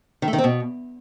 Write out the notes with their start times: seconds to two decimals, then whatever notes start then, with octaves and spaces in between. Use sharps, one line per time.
0.22 D#3
0.28 A3
0.33 D#3
0.38 C4
0.44 B2